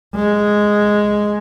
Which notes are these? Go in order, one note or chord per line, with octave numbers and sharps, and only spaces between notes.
G#3